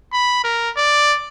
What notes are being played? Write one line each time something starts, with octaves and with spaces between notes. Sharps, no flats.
B5
A#4
D5